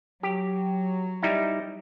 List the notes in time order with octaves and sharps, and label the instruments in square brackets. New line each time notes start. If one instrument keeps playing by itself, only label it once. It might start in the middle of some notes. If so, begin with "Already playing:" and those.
[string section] F#3 [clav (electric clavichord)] G4
[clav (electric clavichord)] G3 D#4 E4